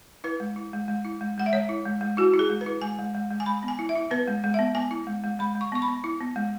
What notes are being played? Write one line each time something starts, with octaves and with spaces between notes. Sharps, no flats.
E4 B4
G#3
E4
G#3
G#3
E4
G#3
G#3 F#5
E5
G#3 C#5
E4
G#3
G#3
E4 F#4
E4
G#4
G#3
B4
E4
G#3 G#5
G#3
G#3
G#3
G#5
G#3 B5
B3
G#5
E4
E5
E4
B3 B4
G#3
G#3
B3 E5
B3 G#5
E4
G#3
G#3
G#3 B5
G#3
C#6
B3 C#6
B5
B3
E4
B3
G#3